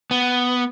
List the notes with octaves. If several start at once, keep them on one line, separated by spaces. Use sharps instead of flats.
B3